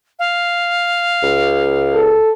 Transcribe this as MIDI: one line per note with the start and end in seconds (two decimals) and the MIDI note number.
0.19 2.02 77
1.23 2.17 37
1.93 2.31 69